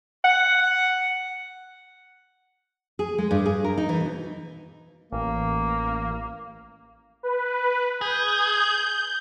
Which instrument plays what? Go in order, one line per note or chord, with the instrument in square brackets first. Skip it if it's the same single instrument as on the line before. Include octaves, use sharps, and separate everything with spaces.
[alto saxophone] F#5
[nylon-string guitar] G#4
G#3
G2
G#4
A#4
D#4
E3
B2
[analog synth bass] A1 [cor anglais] A#3
[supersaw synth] B4
[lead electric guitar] G#4 [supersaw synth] G6